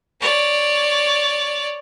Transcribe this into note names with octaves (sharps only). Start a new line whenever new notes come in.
C#5 D5